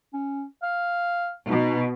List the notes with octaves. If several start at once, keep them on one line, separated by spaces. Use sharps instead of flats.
C#4
F5
B2 D#4